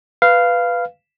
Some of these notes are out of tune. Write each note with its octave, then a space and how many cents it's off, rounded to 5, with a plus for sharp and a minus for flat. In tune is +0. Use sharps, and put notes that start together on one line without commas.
B4 +0 F5 -10